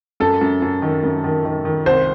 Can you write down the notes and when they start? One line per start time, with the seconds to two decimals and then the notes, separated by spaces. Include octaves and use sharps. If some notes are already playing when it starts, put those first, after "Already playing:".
0.20 F#2 A4
0.41 F#2
0.62 F#2
0.82 D#3
1.04 F#2
1.24 D#3
1.45 D#3
1.65 D#3
1.86 C2 C5